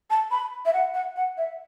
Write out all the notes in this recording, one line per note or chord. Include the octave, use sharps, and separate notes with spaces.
A5
B5
E5
F#5
F#5
F#5
E5